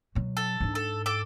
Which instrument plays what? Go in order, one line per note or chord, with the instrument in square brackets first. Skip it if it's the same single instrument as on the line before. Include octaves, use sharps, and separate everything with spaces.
[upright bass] B2 F#3
[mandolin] A4
[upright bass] G#2 D4
[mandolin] A4
A4 D6